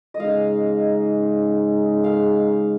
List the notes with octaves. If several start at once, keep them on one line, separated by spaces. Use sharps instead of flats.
D#5
C#3 G#3 D#4 F5
F5